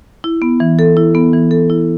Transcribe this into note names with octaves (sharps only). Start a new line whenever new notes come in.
E4
B3
E3
A4
E4
B3
E3
A4
E4